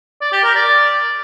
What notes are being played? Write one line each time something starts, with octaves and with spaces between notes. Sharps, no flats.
D5
G4
A#4
D5